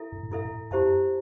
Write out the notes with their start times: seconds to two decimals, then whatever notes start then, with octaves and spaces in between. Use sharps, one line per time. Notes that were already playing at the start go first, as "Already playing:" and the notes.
Already playing: E4 A4 E5
0.12 G2
0.23 A2
0.31 G2 E4 A4 E5
0.45 A2
0.71 F#2 E4 G4 C5 E5 A5